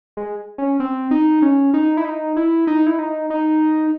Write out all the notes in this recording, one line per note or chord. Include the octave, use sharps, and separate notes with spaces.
G#3
C#4
C4
D#4
C#4
D#4
E4
D#4
E4
D#4
E4
D#4
D#4